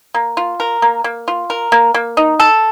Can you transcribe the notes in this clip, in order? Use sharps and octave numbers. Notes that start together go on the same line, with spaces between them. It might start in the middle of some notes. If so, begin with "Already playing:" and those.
A#3
F4
A#4
A#3
A#3
F4
A#4
A#3
A#3
D#4
A4